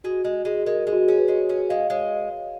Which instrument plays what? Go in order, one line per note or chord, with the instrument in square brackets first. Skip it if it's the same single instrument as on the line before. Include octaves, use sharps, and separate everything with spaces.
[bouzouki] G#3 [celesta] F#4
[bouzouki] G#3
[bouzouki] G#3 [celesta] G#4
[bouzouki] G#3 [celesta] A#4
[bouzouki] G#3 [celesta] G#4
[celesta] F#4
G#4
[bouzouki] C#4 [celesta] G#4
[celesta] B4
[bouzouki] G#3 [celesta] C#5
[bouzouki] C#4
[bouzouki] G#3 [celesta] F5
[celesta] D#5
[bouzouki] G#3 [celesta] C#5